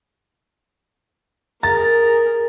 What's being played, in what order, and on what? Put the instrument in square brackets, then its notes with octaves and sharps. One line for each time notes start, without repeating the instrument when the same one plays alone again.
[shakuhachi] G#4 [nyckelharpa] A#4 [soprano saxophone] A#5 [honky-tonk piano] A6